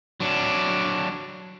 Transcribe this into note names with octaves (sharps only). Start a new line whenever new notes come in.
F#3 D4